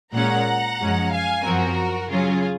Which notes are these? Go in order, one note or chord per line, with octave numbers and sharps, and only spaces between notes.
A#2 G#3 C#4 F#5 A#5
F#2 F3 G#3 C#4
F5 G#5
F#2 F3 C4 F#4 A#4
C#3 F#3 C#4 F4 G#4